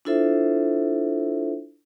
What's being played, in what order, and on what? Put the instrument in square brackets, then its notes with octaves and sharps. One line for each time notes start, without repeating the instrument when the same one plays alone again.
[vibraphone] D4 E4 F4 A4 C5 E5